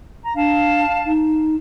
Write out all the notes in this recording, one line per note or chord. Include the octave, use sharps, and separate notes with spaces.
A#5
D4 F5 A5
D#4